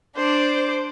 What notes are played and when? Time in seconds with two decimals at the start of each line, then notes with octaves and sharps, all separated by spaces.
0.17 D4 C5 D6